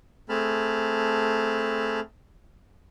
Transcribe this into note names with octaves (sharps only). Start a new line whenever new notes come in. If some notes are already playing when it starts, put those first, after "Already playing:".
A3 C4 G#4 A5 B5 F6